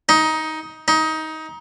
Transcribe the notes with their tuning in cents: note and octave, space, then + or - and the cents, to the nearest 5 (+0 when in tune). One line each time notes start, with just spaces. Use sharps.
D#4 +15
D#4 +20